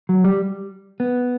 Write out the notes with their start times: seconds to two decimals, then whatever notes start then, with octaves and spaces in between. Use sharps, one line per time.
0.09 F#3
0.24 G3
1.00 B3